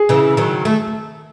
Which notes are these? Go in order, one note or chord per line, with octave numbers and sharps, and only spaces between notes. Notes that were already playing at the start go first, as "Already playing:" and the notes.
Already playing: G#4
C#3 E3
D#3 F#3
A3